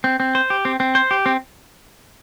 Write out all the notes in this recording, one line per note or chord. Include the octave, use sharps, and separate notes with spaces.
C4
C4
C5
G4
C4
C4
C5
G4
C4